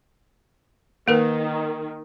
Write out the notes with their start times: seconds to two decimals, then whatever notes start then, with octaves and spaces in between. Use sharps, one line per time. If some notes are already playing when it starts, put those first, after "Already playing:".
1.08 D#3 A#3 A#4 B4